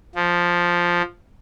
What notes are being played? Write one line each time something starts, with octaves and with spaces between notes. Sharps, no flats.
F3